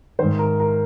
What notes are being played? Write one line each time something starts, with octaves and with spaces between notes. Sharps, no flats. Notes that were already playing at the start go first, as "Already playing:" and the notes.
G#2 D#3 C5
A#4
A#4